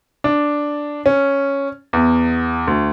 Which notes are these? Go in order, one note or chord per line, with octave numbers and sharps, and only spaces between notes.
D4
C#4
E2
D2